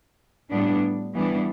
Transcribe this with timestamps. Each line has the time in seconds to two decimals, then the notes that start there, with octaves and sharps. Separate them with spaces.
0.50 A2 G3 B3 D4
1.13 E3 G3 B3 D4